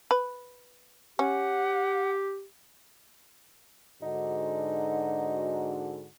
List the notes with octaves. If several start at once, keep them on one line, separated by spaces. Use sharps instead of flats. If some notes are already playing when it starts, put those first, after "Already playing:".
B4
C#4 G4 F#5
G#2 D3 D#4 F#4